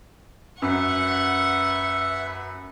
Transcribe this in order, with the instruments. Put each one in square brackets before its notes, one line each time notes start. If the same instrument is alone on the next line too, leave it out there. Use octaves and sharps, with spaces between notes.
[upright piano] F#2 [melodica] B4 E5 [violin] F#5 C#6